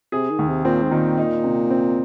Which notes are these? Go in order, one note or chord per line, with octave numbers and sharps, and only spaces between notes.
C3 G#4
D#3
D#2
C3
A#2 C4
G#2
A#2 D#3
D#4
C3
C4